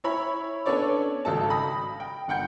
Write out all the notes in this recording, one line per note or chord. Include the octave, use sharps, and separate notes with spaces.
E4 C#5 B5
B3 C#4 D4 A4 C#5 D5
G#1 C#3 F#4 A4 D#5 A5
B5 D#6 A#6
G5
G1 F#5 G5 G6 C#7